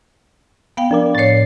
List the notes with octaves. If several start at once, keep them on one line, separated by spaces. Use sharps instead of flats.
B3 F5 G5
F3 D4 A#4 D5
A2 C#5 A6 C7